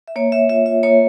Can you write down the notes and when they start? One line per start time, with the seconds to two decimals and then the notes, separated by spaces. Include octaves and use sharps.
0.08 E5
0.16 A#3 C#5
0.32 A#3 E5
0.49 F4 E5
0.66 F4 E5
0.83 A#3 C#5